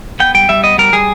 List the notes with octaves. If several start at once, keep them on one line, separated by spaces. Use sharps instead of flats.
B3 G5
G3 G5
G3 E5
B3 D#5
G3 A#4
G3 G#4